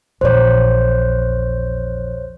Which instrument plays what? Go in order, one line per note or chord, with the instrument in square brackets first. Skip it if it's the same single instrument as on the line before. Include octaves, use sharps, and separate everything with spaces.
[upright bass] A#1 E2 [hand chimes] C5 C#5